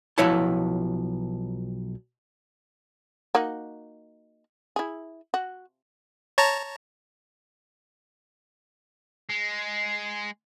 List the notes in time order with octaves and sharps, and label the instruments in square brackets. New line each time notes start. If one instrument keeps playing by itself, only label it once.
[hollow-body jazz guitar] B1 F3 E4 C#5 A5
[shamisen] A#3 D#4 F#4
E4 G#4
F#4
[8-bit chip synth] C#5 A5 A#5
[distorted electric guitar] G#3